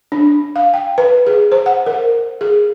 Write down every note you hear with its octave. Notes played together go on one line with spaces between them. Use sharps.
D4
F5
G5
B4
G#4
C5
F#5
A#4
G#4